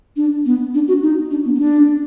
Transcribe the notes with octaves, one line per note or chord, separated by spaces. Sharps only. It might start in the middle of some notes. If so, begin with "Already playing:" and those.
D4
B3
D4
F#4
D#4
D4
B3
B3
D4